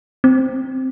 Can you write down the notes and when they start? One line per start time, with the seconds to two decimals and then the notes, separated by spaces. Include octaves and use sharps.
0.24 C4